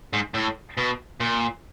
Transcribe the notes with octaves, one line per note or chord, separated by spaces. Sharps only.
G#2
A2
B2
A#2